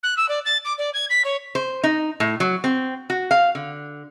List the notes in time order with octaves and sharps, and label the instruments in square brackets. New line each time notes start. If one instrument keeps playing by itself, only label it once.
[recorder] F#6
E6
D5
A6
D6
D5
G#6
B6
C#5
[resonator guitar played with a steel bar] C5
D#4
A2
F#3
C4
F#4
F5
D3